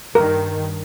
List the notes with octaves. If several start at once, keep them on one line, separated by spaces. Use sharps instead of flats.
G2 D#3 A#4